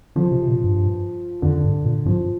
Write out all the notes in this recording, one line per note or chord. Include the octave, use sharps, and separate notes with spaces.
D3 F3
C3
C3
A#2
G2
F2 D3
G2
A#2
G2 F3